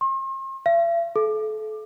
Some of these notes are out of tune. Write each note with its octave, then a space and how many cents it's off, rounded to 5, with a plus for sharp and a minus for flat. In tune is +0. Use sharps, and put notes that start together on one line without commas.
C6 +45
E5 +45
A4 -30